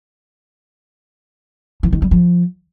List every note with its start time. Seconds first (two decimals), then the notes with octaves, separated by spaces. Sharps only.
1.83 E3
1.93 D#3
2.02 G3
2.11 F3